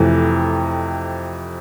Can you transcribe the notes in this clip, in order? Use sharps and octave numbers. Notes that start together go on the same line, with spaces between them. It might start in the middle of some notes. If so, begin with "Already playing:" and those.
Already playing: F2 C3 E3 A3